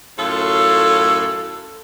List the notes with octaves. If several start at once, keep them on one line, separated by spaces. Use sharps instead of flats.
F#2 A2 F4 A4